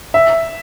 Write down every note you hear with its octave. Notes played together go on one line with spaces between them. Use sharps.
E5